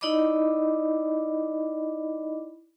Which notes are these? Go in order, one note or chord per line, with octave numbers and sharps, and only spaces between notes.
D#4 E4 D5 D#5 B5 D6